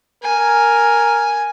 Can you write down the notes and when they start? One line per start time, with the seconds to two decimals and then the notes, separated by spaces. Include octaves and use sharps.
0.24 A#4 G#5